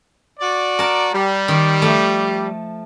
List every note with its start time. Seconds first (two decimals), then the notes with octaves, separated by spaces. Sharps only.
0.39 F#4 D5
0.79 A#4 A5
1.13 G3
1.48 D#3
1.82 F3 A3